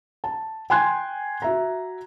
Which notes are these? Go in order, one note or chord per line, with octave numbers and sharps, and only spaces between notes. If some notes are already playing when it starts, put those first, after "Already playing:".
A5
G5 G#5 C6 F#6 G#6
F#4 E5 A#5